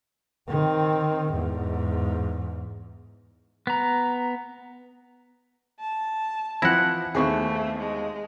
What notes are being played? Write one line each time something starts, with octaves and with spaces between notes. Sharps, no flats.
D#3 C4
E2 G#2
B3 A#5
A5
E3 F3 C4 E4 F#5 A#6
D#2 A3 B3 C4 G#4 C#6
G#3